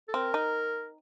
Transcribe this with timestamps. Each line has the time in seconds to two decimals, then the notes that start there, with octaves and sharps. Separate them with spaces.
0.08 A4
0.14 C4 A#4
0.34 D#4